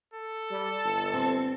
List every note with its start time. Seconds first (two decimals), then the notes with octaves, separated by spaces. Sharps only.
0.13 A4
0.51 G3
0.84 G1 A5
1.13 C4